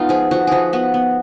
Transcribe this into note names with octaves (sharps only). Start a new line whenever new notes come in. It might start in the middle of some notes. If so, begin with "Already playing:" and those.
Already playing: G#3 B3 D#4 F4
F3 G#4
F3 F#4
F3 F#4 G#4
B3 F#4
B3